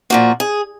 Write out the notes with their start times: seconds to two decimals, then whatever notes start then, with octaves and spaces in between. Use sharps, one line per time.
0.10 A#2 F3 A#3 F#4
0.40 G#4